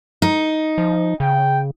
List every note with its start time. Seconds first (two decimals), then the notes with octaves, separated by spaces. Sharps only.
0.22 D#4
0.78 F3
1.20 C#3 G5